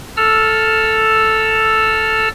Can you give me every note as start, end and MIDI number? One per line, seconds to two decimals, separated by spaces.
0.17 2.29 69
0.17 2.29 88
0.17 2.29 89